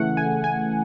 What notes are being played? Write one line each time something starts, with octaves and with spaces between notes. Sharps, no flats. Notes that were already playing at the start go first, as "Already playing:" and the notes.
Already playing: C#3 E3 A3 F#5
G#5
G#5